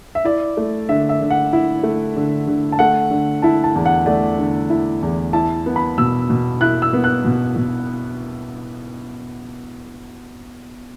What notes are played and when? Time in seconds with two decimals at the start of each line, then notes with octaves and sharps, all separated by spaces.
0.15 E5
0.25 E4 D5
0.57 A3
0.89 D3 E5
1.09 E5
1.21 D3
1.30 F#5
1.53 E4
1.83 A3
2.16 D3
2.47 D3
2.72 A5
2.79 A3 F#5
3.11 D3
3.42 E4 A5
3.64 A5
3.75 E2
3.86 F#5
4.06 A3 D5
4.38 D3
4.70 E4
5.02 E2
5.33 E4 A5
5.66 B3
5.76 B5
5.98 B2 E6
6.30 B2
6.61 E4 F#6
6.82 E6
6.93 B3
7.04 F#6
7.24 B2
7.56 B2